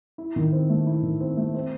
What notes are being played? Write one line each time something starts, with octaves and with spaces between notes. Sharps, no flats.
E4
D#3
C4
A3
E4
D#3
C4
A3
C4